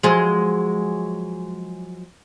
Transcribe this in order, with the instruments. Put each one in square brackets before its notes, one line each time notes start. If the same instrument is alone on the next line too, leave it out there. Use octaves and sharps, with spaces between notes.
[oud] F3 F#3 G#3